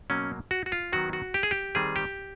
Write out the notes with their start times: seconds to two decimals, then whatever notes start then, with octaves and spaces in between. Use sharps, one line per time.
0.10 B2 F#3 A#3 C#4
0.51 F#4
0.66 F#4
0.72 F4
0.93 D#3 F#3 B3 F#4
1.13 F#4
1.34 G4
1.43 G#4
1.51 G4
1.75 D#3 G3 C4 G#4
1.96 G4